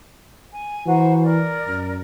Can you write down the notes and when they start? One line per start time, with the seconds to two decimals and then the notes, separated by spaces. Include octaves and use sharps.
0.51 G#5
0.86 E3 F#4 C5 A#5
1.23 A#4 D5
1.66 F#2